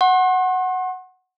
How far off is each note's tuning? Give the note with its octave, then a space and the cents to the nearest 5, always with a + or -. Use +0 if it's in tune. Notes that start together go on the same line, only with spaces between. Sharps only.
F#5 +0 C6 +45